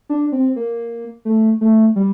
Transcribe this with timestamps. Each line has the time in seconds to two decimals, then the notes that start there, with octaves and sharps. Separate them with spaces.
0.10 D4
0.32 C4
0.56 A#3
1.25 A3
1.61 A3
1.96 G3